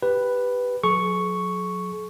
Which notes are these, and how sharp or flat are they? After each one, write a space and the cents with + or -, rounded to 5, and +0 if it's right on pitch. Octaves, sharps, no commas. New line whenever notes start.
G4 +0 B4 +0
F#3 -25 G#4 +45 C#6 +0